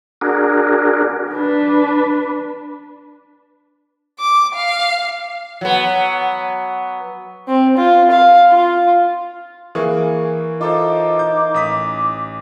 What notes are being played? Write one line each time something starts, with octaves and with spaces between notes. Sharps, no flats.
D4 F#4 G#4 A#4
D4 B4
D6
F5
F#3 B3
C4
F4
F5
F4
E3 A#3 G#4 C#6
D#4 F4 A4 C5 D6
G6
A1 D#6 B6